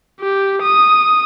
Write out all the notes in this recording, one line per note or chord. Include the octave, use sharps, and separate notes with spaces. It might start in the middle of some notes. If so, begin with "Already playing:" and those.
G4
D#6